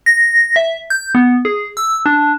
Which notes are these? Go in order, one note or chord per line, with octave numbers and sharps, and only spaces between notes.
A#6
E5
G6
B3
G#4
E6
D4